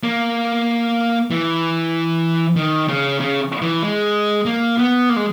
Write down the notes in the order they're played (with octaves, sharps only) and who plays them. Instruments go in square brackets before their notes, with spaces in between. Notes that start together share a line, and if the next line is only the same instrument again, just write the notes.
[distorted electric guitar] A#3
E3
D#3
C#3
C#3
E3
G#3
A#3
B3
A#3
G#3